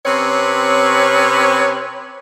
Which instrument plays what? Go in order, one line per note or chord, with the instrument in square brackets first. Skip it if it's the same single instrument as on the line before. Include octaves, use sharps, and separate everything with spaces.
[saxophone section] C3 C4 C#4 B4 C#5